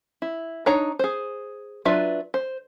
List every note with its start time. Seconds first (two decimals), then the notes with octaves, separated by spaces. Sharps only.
0.22 E4
0.66 D4 D#4 C#5 A#5
0.99 G#4 C5
1.85 F#3 D4 F4 B4 E5
2.34 C5